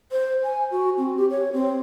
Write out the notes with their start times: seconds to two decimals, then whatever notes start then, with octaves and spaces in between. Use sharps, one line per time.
0.12 C5
0.43 G#5
0.71 F#4
0.98 C4
1.17 G4
1.31 C#5
1.53 C4